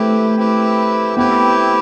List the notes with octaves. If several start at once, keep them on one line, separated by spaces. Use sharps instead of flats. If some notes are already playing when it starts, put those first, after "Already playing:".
Already playing: A3 C4 E4 G4 B4
C4 E4 G4 B4
B3 C4 E4 G4 B4